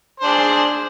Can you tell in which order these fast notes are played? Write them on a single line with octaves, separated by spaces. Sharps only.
C5 D4 G#4